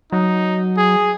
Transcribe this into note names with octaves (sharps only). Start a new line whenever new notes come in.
F#3 D#4
G#4